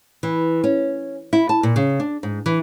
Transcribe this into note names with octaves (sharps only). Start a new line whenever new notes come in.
E3
C#4
E4
A5
A#2
C#3
D4
G#2
E3